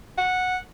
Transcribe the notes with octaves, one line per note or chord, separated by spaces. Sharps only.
F#5